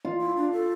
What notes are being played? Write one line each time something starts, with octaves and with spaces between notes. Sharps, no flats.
F4
E4
D4
A4